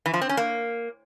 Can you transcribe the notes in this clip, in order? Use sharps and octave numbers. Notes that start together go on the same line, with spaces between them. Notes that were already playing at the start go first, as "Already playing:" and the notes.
E3
F3
C4
C#4
A#3